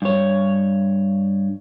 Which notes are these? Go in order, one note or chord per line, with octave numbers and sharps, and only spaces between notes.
G2 C#5